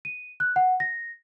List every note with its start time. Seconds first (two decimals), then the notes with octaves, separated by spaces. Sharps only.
0.05 D#7
0.40 F#6
0.56 F#5
0.80 A#6